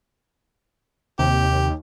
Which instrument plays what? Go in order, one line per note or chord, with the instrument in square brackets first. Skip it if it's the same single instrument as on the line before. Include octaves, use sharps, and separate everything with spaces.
[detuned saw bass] D#2 [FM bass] C3 [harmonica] G4